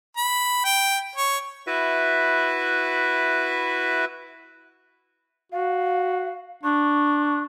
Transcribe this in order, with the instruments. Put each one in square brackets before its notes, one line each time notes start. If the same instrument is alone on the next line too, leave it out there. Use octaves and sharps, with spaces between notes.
[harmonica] B5
G5
C#5
[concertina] E4 F#4 B4 E5
[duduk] F#4 [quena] F5
[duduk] D4 [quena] C#6